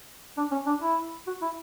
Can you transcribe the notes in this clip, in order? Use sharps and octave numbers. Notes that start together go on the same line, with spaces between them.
D4
C#4
D4
E4
F#4
E4